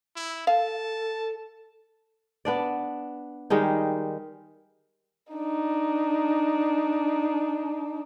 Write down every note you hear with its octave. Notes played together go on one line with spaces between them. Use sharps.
E4
A4 F5 A5
B3 D4 D5
D#3 G3 G#3 D#4
D4 D#4